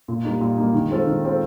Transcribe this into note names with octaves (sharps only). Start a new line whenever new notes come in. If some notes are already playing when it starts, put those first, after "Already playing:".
A#2
G3 A#3 D#4
A#2
G3 A#3 D#4
D#3
G#3 C4 F4 A4
D#3
G#3 C4 F4 A4